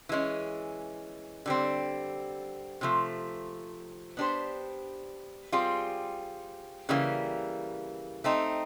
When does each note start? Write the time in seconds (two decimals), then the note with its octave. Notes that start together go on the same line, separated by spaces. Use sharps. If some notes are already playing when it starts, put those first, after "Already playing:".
0.09 E3 G#3 C#4
1.46 D3 G3 C4
2.81 C3 F3 A3
4.17 B3 D4 G4 C5
5.52 G3 C4 F4 G#4
6.89 C#3 E3 G3 A#3
8.24 A3 C4 D#4